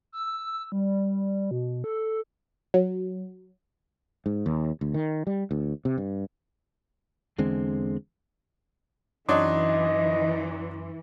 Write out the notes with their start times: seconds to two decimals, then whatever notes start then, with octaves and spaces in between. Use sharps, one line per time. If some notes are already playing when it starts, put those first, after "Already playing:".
0.12 E6
0.72 G3
1.51 B2
1.84 A4
2.74 F#3
4.26 G#2
4.46 D#2
4.81 D2
4.94 D#3
5.27 G3
5.51 D2
5.85 C3
5.98 G2
7.38 E2 D3 G#3 C4
9.29 F#2 E3 F#3 D4 D#4 D#5 C6 D6